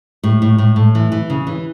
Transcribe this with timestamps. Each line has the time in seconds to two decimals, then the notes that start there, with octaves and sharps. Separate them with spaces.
0.23 A2
0.42 A2
0.58 A2
0.76 A2
0.95 E3
1.12 E3
1.30 C#3
1.47 E3